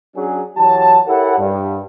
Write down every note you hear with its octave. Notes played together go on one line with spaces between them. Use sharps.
F#3 C#4 D4 G#4
E3 F#3 G4 C#5 A5
E4 G4 A4 A#4 C#5 F#5
G2